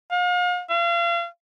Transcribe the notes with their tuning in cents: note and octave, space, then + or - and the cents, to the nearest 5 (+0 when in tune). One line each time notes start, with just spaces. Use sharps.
F5 +40
F5 -35